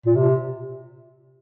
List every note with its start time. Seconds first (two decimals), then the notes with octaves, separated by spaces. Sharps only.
0.06 A#2
0.16 C3